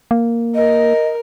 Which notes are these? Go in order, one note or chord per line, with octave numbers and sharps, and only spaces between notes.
A#3
A#4 D#5